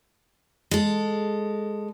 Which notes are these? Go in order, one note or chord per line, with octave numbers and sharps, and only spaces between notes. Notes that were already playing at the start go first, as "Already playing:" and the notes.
G#3 A4